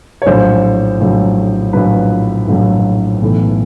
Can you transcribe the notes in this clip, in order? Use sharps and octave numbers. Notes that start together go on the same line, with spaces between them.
C#5
A#1 A2 F#3 C5
A#1 A2 F#3
A#1 A2 F#3 B4
A#1 A2 F#3
B1 A2 E3 A3